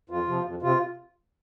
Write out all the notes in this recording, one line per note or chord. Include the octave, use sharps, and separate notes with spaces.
F2 F4
C3 F3
F2
C3 F4